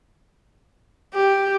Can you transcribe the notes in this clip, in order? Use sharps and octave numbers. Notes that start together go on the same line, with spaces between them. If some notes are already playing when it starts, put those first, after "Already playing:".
G4